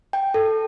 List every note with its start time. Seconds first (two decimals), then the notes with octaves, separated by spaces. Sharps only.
0.13 G5
0.34 A4